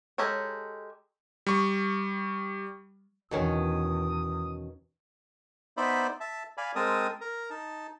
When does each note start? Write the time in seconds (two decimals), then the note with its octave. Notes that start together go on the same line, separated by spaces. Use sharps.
0.18 G#3 G4 A4 A#4 C#5
1.47 G3 C#6
3.31 E2 B2 D#3 C#4 D#6
5.77 B3 D#4 C5 D5 E5 B5
6.20 E5 A5
6.58 D5 F5 G#5 B5
6.76 G#3 C4 A#4 A5 D#6
7.21 A#4 A#5
7.50 D#4 A5